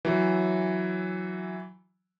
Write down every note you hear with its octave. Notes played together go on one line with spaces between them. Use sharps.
E3 F#3